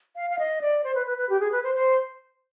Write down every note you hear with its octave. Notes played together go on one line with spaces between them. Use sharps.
F5
F5
D#5
D5
C5
B4
B4
B4
G4
G#4
B4
C5
C5